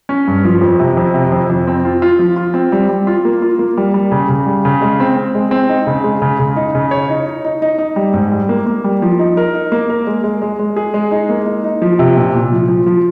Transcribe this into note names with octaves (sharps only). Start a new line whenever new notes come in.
C#4
G2
F3
F2
C3
F2
C3
F2
F2
C4
F4
F4
F3
F4
C4
G3
G3
F4
A#3
F4
A#3
G3
G3
C#3
C#3
G3
C#3
G#3
C4
C4
G#3
C4
D#4
C#3
G#3
C#3
C#3
D#4
C#3
C#5
D#4
D#4
D#4
D#4
D#4
G3
G#2
G3
A#3
A#3
G3
F3
D#4
A#4
D#4
A#3
A#4
G#3
G#3
G#3
G#3
G#4
G#3
D#4
A#3
D#4
D#4
F3
C3
A#2
A#2
F3
F3
F3